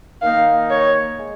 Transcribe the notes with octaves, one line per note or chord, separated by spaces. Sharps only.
D#3 A#3 D#4 F5
C#5
G#3